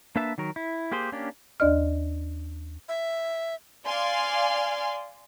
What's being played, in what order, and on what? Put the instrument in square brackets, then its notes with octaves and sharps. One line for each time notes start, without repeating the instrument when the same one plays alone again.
[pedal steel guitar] A#3 D4 B4 E5 A5
D#3 F#3 A#4
E4
A#3 G4 G#4 C5
A#3 C#4 D4 G4
[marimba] D#2 D4 D5 D#5 F6
[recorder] E5
[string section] D5 F5 G#5 C6